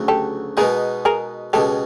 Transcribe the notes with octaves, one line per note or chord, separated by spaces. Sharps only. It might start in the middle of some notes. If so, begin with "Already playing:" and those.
Already playing: D2 C#3 F#3 A3
G4 A4
B2 G#3 B3 D#4 G#4 A#4
G#4 A#4
C#2 B2 G#3 G4 A4